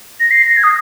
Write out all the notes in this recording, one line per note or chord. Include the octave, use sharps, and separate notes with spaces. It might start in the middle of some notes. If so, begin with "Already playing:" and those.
A#6
C7
A#6
G#6
D#6